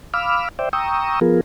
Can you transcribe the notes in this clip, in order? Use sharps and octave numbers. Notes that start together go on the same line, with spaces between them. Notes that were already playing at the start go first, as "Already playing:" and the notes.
F5 B5 D6 E6 F6
C5 D5 E5 G5
G5 A#5 C#6 D#6 E6
F3 B3 F4 G#4 A#4